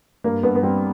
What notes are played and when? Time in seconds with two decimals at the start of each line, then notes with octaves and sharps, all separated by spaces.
0.24 G2 A#3
0.43 G2 B3
0.55 B3
0.63 G3 C4